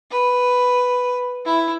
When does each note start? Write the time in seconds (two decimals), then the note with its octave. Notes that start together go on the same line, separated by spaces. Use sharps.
0.11 B4
1.45 E4